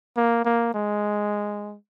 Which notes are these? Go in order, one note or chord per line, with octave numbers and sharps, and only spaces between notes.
A#3
A#3
G#3